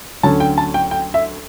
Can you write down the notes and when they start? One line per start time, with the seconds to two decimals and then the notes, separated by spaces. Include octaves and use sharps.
0.23 D2 D3 F#3 C#4 A5
0.40 G5
0.58 A5
0.74 G5
0.91 G5
1.14 E5